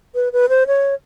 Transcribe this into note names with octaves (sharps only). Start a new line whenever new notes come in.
B4
B4
C5
C#5